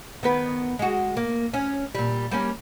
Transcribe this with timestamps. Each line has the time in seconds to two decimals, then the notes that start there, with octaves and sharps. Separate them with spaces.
0.23 D#3 B3 B4
0.79 G#3 F#4
1.17 A#3
1.54 C#4
1.95 A#2 G3
2.31 G3 A#3 C#4